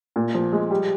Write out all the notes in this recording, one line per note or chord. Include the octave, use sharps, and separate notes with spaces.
A#2
F3
G#3
G3